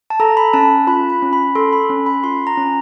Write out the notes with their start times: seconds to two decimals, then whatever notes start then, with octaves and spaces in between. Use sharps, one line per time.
0.10 A5
0.20 A4 A#5
0.37 B5
0.54 C#4 A5
0.87 F4 B5
1.10 B5
1.22 C#4
1.33 B5
1.55 A4 C6
1.72 B5
1.90 C#4
2.06 B5
2.24 F4 C6
2.47 A#5
2.57 C#4